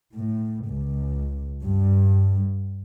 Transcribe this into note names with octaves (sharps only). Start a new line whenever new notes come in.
A2
C#2
G2